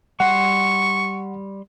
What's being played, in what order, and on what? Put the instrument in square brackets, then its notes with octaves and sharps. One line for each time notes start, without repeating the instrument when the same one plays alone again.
[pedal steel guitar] G3 C6 [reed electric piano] F#5 [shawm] C#6